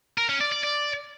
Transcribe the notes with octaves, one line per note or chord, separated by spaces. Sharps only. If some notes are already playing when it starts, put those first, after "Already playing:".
A#4
C#4
D5
D5
D5